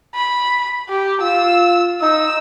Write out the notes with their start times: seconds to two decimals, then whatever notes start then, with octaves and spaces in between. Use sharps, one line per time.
0.15 B5
0.89 G4
1.21 F4 E6
2.01 D#4 E6